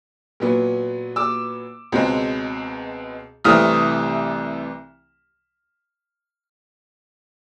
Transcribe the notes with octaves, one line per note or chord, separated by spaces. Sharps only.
A#2 F#3 B3
D6 E6
C#2 B2 G#3 C4
C2 C3 E3 A3 C4 D#6 F6